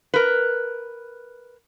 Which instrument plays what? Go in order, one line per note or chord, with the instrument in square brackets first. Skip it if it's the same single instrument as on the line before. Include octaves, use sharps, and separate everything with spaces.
[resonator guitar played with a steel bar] A#4 B4